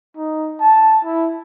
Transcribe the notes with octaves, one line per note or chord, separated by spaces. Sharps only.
D#4
A5
E4